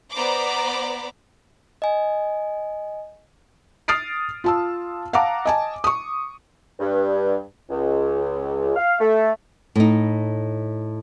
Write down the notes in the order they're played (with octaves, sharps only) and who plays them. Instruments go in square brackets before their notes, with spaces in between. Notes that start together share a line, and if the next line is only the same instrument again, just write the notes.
[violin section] B3 C5 D5 A#5 B5 D6
[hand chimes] D#5 G#5
[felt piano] D#6 F6 A6 C7 D7
F4 A5 E6
F5 F#5 A5 A#5 D6
D#5 G#5 A5
C#6 D#6
[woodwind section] G2
C#2
F5
A3
[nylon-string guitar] A2 D#4